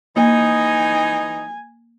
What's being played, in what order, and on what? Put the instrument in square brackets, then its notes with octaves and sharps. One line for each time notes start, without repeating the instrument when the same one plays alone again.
[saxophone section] E3 D#4 [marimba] A#3 [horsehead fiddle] G#5